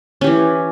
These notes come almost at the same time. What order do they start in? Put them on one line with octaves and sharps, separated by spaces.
C#4 G4 E3